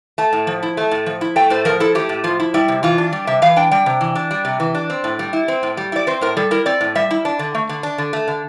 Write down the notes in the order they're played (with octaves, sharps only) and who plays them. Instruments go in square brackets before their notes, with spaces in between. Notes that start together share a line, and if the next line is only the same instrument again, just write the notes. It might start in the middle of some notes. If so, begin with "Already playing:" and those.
[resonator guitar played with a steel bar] A3 A5
A2
F3
E4
A3
A2
F3
E4
A3 G5
A2 C5
F3 A#4
E4 A4
A3 G4
A2
F3 F4
E4
G3 E4
C3
E3 F4
D4
G3
C3 E5
E3 F5
D4 G5
G3 G5
C3
E3
D4
G3
C3
E3
D4
C4
A2
G3
E4
C4
A2
G3
E4 D5
C4 C5
A2 A#4
G3 A4
E4 A#4
C4 D5
A2
G3 E5
E4
D4
D3
A3
D3
D4
D3
A3
D3